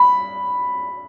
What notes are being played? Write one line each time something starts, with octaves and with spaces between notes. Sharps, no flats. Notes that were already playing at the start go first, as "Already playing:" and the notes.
Already playing: B5